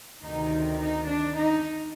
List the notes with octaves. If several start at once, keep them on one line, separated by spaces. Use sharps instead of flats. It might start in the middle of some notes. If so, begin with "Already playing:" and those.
D2 C3 D#3 D#4
D#4
D4
D#4